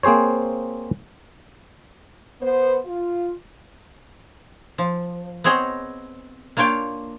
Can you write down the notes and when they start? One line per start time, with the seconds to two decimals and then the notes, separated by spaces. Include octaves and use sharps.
0.03 A#3 C4 G#4 C5 C#5
2.41 B3 C5
2.85 F4
4.78 F3
5.44 B3 C4 G#4 C#5 D#5
6.57 A#3 D4 F4 C#5 G5